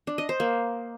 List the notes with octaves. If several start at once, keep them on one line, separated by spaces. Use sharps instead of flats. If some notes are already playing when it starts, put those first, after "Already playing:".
D4
D#5
C5
A#3